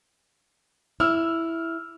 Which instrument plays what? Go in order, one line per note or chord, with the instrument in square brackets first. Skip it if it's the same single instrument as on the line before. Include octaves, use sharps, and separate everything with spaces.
[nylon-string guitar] E4 [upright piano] E6 F6